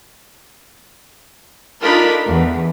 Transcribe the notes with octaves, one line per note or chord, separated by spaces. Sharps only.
D4 D#4 F4 A4 A#4 B5
E2